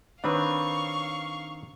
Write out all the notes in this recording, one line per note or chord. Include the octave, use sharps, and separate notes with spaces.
D#3 C4 D4 B4 C#5 F5 B5 C#6